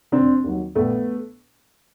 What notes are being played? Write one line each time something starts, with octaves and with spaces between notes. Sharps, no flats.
F1 C4 D4
D#2 D#3 F#3
A#1 A3 B3